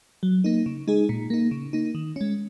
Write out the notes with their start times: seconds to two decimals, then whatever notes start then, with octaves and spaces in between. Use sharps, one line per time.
0.23 F#3
0.44 A#3 D#4
0.66 C#3
0.88 G#3 D#4 G#4
1.09 A#2
1.30 A#3 D#4
1.51 C#3
1.73 A#3 D#4
1.95 D#3
2.16 G#3 C#4